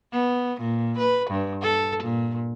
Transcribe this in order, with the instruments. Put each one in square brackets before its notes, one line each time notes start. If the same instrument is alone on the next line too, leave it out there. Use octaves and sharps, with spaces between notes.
[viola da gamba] B3
A#2
B4
G2
A4
A#2